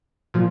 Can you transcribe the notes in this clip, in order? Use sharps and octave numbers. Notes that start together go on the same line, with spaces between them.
A#2 F3